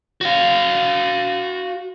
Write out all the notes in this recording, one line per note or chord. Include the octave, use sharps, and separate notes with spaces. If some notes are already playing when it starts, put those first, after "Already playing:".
F#4 F5